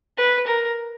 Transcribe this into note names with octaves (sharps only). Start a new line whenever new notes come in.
B4
A#4